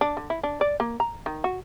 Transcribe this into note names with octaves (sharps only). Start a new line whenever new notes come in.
D4
D3
E4
D4
D5
A#3
A#5
D#3
F#4